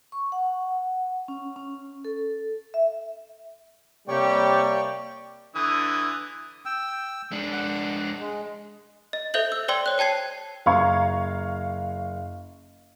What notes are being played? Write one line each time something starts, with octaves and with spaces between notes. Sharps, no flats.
C#6
F#5
C#4
C#4
A4
E5
C3 G3 A#3 G4 C#5 D5 G5 C#6
D3 E3 D#6
G5 E6
G#3 D4
F#5
G#3
D#5
A4 C5 E5 G6 F#7
E6
C5 D5 G5 C6 E6 G7
C#5 F#6
C5 G5 A5 G#6 C7
F#1 F5 A#5 C#6 G#6